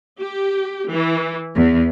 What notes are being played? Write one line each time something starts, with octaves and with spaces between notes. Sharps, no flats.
G4
E3
E2